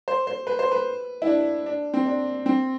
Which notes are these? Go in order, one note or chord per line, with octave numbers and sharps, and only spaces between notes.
C5
C5
B4
C5
B4
E4
D4
D4
C4
D4
C4